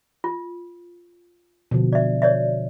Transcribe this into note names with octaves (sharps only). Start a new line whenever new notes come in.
F4
B2 D3 F3
D5 E5
C#5 D5 E5